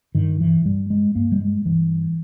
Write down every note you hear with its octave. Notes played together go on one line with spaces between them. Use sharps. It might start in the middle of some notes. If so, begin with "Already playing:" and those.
G2 D#3
E3
G2 G3
G#3
G2 A#3
G3
G#3
G2 E3